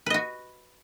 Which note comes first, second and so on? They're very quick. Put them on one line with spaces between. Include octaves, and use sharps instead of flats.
B4 D#5 F#4